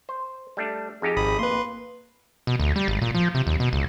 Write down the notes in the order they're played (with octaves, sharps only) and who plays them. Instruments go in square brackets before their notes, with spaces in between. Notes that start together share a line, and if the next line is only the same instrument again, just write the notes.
[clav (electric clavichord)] C5
G3 A3 D4
[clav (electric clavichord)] F2 D#4 G4 [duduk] G#4
[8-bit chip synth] G#1 B5 D#6
[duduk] A#3 [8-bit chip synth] B4 C6
[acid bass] B2
D2
G3
G#1
A#2
F3
C3
D#2
B2
C#2